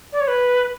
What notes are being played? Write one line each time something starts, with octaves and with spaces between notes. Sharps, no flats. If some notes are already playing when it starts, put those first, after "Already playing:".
D5
C#5
B4